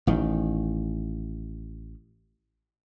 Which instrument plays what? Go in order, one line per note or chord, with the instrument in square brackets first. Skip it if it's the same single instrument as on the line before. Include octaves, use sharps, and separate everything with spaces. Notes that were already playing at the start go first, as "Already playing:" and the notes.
[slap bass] A1 D#3